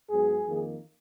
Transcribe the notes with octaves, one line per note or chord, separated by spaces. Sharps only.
G#2 F#3 B3 G#4
F2 D#3 A#3